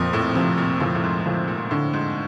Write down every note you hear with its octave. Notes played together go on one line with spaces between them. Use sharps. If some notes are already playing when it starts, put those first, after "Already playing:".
Already playing: F2 A#2
A2
C3 F3
A#2
A2 F3
A2
G#2
A2 F3
A#2
A2 D3
G#2